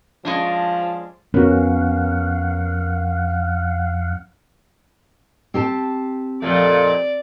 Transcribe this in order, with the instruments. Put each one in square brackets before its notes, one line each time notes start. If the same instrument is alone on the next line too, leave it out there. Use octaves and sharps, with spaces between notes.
[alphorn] F3 [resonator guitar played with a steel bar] G#3 C#4 D4
[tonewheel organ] F2 F5 F#5 [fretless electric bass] B3 [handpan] C#4 [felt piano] F#4 A#4
[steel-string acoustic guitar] C4 G4 A5
[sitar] F2 A#2 A3 [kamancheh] D5